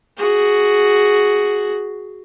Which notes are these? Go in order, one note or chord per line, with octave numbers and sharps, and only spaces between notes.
F#4 G#4